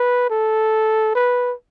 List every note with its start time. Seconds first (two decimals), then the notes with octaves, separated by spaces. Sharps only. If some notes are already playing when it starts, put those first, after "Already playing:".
Already playing: B4
0.30 A4
1.15 B4